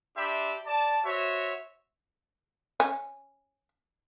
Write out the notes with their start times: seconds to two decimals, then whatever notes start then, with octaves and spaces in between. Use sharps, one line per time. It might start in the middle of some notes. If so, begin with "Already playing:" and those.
0.17 D4 G4 E5 B5 C6
0.67 D5 A5
1.05 F#4 C5 C#5 E5
2.80 C#4